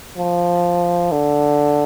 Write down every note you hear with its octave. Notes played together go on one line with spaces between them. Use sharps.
F3
D3